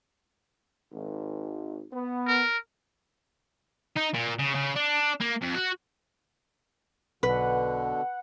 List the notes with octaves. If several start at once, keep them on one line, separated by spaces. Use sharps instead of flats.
G#1
B3
A#4
D#4
A#2
C#3
C#3
D4
A#3
F2
F#4
B1 B2 D3 B4 F#5